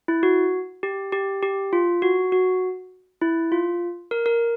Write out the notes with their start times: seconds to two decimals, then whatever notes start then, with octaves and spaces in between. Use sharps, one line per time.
0.08 E4
0.23 F#4
0.83 G4
1.12 G4
1.43 G4
1.73 F4
2.02 F#4
2.32 F#4
3.21 E4
3.52 F4
4.11 A#4
4.26 A#4